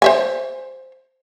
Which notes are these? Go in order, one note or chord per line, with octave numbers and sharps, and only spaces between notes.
C5 E5 G#5